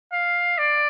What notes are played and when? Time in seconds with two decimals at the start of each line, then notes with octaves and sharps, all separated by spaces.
0.12 F5
0.58 D5